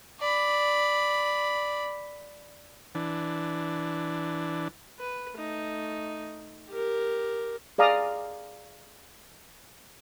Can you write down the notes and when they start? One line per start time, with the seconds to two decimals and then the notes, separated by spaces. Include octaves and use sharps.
0.20 D5 B5
2.95 E3 D4
5.00 B4
5.35 A3 D#4
6.70 G4 A#4
7.78 G#4 D5 F5 A#5 D#6